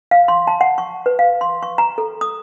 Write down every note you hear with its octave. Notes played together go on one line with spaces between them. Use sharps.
F5
C6
A5
F#5
C#6
B4
F5
C6
C#6
A#5
A4
D#6